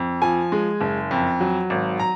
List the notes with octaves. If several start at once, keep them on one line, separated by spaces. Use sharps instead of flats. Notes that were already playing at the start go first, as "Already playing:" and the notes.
Already playing: F2
F3 G#5
G#3
F#1
F2
F#3
G#1
A#5